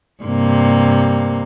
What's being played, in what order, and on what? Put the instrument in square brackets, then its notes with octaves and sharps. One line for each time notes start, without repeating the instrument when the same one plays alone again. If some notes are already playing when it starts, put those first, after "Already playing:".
[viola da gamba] G2 C3 A#3